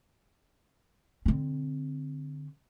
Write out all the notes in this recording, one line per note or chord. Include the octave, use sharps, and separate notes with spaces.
D3 C4